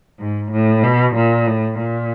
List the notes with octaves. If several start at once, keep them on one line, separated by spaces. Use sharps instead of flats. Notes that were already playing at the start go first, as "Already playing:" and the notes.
G#2
A2
B2
A#2
A2
A#2